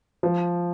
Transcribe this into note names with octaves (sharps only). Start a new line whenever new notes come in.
F3